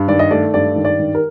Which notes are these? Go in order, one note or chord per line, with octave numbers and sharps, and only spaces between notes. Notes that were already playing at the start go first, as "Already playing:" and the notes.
Already playing: G2
D#3 D5
D#5
A3 D5
G2 D5
D#3
D5
D#3
A#4